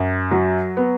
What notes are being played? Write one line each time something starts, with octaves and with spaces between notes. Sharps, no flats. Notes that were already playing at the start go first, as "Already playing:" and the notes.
Already playing: F#2
F#3
B3